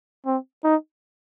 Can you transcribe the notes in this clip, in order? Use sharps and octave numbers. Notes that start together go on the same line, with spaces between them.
C4
D#4